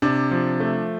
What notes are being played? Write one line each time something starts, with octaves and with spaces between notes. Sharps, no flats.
C3 D4
F3
A3